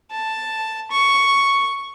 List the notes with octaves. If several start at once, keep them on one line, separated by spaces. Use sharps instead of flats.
A5
C#6